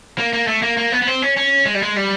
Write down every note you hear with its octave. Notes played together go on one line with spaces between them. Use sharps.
A#3
A#3
A3
A#3
A#3
B3
B3
C4
C#4
C#4
G#3
G3
G#3
G3